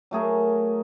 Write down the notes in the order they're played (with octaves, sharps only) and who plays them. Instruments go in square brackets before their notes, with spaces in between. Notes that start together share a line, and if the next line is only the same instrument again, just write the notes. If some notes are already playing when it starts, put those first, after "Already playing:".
[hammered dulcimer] F#3 A3 G#4 A#4